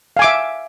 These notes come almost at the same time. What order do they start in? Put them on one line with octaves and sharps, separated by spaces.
F5 G#5 D6 E5